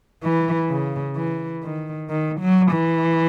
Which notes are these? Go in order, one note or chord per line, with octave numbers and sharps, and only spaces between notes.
E3
C#3
E3
D#3
D#3
F#3
E3